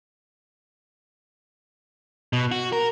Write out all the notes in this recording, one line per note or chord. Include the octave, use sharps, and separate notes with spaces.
B2
F#4
A#4